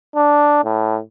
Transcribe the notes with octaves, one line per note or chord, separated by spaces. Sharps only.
D4
A2